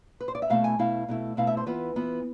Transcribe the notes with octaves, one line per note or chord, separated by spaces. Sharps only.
B4
C5
D5
E5
B2 A3 E4 F5
G#5
B2 A3 E4 F5
B2 A3 E4
B2 A3 E4 F5
E5
C5
E3 B3 F4 B4
E3 B3 F4